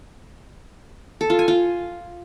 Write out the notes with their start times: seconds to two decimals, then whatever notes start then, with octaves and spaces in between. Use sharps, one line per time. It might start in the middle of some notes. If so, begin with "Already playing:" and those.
1.21 A4
1.30 F4
1.39 G#5
1.48 F4